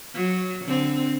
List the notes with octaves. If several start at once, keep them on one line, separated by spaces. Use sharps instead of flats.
F#3
D3 C4